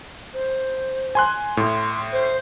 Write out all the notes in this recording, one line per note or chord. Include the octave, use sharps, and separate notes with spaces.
C5
G#5 C6 F#6
A2 C6
C5